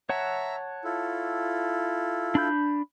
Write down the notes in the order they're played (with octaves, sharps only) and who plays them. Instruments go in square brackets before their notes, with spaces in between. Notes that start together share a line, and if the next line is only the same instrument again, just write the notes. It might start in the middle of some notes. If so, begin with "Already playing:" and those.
[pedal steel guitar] C#5 F#5 A5 [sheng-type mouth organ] E5 A#5 E6
[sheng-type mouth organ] E4 F4 A4
[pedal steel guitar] D4 B5 G6